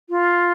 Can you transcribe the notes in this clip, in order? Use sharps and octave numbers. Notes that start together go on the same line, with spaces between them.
F4